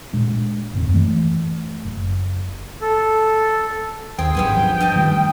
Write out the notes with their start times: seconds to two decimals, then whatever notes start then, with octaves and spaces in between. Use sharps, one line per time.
0.13 A#2 G#3 D4
0.73 D#1 F#2 C4
0.94 E3 A3
1.85 F#1
2.81 A4
4.18 D#2 C4 G#4 G5
4.35 G#1 G2 F#3 B3 G#5
4.57 F3 F#3
4.80 G2 D#5 A5
4.96 D#3 G3 A3